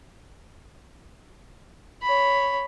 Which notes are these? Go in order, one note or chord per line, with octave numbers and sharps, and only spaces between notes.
C#5 B5